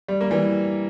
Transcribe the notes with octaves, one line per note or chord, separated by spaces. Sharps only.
G3
A#3
E3 G3